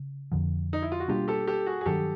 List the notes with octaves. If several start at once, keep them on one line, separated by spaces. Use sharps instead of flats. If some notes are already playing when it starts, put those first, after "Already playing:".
Already playing: C#3
F2 D3 F3
D#4
E4
F4
F#4
B2 G3 A#3 D4 F4 G4
G4 A4
G4 A4
F#4 G#4
G#4
G2 D#3 F#3 G4 A4